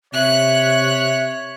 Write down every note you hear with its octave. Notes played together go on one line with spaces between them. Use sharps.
C3 C#5 E5 F#6